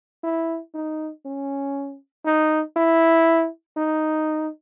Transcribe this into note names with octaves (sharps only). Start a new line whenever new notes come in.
E4
D#4
C#4
D#4
E4
D#4